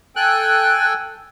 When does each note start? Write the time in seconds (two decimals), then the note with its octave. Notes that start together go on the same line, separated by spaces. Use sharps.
0.16 A4 G5 G#5 F#6